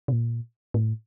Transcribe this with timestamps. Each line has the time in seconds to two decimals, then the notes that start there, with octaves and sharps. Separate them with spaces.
0.08 C3
0.12 A#2
0.74 A2